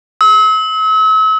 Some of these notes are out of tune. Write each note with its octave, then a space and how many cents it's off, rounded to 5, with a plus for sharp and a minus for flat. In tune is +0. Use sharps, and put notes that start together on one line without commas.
E6 -40